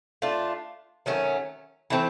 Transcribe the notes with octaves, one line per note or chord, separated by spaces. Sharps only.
A3 D4 F4
D#3 F#3 A3 C#4
E3 A3 C4